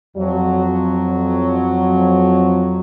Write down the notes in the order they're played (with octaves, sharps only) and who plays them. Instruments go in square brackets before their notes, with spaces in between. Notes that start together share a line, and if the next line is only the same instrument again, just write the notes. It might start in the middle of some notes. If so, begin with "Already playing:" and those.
[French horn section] F2 F#3